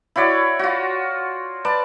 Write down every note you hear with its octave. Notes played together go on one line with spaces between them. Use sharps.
E4 F#4 C#5 D5
F4 F#4
B4 D5 A5